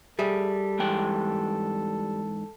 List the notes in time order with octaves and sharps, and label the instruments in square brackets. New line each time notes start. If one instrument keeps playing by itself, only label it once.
[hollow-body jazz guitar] G3 G#4 E5 [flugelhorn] A4
[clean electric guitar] G#2 E3 G5